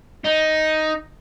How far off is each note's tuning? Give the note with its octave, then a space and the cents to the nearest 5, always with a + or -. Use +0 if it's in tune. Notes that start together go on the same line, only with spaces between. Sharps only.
D#4 +5